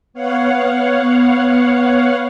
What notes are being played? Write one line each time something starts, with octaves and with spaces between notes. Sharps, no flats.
B3 C#5 F5 F#5